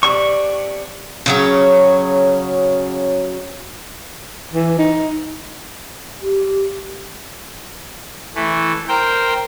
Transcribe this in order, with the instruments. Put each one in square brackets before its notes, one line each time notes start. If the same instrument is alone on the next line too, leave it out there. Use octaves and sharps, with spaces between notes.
[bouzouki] C3 D4 [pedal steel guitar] C#6
[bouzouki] C#3 F#3 C#4
[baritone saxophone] E3
D#4
[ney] G4
[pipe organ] E3 A3
A#4 C5 G5